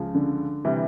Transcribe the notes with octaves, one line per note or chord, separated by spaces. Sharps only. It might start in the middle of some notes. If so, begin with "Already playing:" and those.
Already playing: C#2 C#3 F3
D3
C3 E3 G3